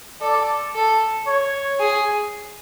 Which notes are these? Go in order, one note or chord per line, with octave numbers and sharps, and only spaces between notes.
A4 D5
A4
C#5
G#4